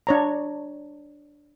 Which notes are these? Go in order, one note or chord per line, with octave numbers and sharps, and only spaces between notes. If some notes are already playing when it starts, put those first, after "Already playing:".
D4 C#5 A#5